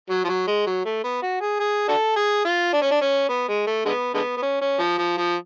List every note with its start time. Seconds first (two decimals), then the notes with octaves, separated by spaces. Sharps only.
0.10 F#3
0.24 F3
0.28 F#3
0.47 G#3
0.66 F#3
0.85 A3
1.04 B3
1.22 F#4
1.41 G#4
1.59 G#4
1.88 D4 F#4 A4
2.16 G#4
2.45 F4
2.73 D4
2.82 C#4
2.91 D4
3.01 C#4
3.29 B3
3.48 G#3
3.67 A3
3.85 D3 G#3 B3
4.14 D3 G#3 B3
4.37 B3
4.42 C#4
4.61 C#4
4.79 F3
4.98 F3
5.17 F3